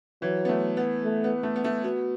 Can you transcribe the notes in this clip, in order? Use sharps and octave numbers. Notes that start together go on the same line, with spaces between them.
E3 F#3
B3
A3
B3
A3
B3
A3
B3
A3
B3 F#4